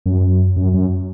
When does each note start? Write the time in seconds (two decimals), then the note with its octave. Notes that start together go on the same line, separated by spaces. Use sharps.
0.06 F#2
0.57 F#2
0.74 F#2